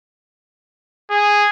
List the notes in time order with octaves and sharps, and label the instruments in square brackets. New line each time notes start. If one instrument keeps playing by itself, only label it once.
[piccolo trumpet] G#4